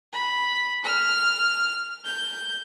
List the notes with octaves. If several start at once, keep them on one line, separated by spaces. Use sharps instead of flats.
B5
F6
G6